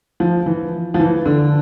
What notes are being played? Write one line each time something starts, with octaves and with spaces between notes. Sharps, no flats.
F3
E3
F3
E3
D3